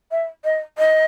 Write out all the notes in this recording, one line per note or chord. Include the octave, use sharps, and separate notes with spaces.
E5
D#5
D#5